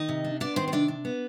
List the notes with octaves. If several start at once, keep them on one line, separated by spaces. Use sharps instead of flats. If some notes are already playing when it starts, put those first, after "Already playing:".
Already playing: D#3 D#4 D#5
C3
D4
B3 D4 D5
D#3 C4 C5
C5
C3 D4 D5
D4
B3